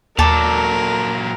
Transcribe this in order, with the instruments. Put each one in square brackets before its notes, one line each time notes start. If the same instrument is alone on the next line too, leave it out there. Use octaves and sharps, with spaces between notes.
[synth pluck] D#2 [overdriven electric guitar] A#2 F#3 [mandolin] A4 D5 [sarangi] A#4